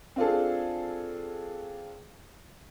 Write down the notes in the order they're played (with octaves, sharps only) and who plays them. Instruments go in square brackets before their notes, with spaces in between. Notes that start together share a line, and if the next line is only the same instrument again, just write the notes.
[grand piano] C4 D4 F4 G#4 A4